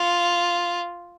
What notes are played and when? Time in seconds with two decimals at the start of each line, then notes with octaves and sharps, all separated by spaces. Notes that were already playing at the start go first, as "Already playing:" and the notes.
Already playing: F4